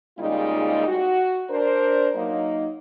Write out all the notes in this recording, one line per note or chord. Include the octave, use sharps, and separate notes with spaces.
C#3 G3 G#3 A#3 D#4 F4
F#4
D4 A#4 C5
F#3 A#3 D#4